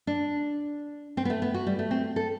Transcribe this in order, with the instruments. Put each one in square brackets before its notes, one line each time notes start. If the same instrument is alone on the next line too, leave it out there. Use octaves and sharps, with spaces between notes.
[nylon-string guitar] D4
C4
B3
A3
B3
F#4
G3
A3
C4
A4